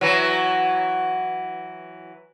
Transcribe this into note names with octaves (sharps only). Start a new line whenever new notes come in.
E3 F#3